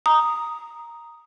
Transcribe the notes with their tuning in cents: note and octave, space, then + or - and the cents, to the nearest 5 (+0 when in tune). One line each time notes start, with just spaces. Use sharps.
A#5 +0 D#6 +0